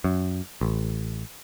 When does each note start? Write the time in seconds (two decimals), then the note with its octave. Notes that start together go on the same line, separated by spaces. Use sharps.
0.04 F#2
0.61 A1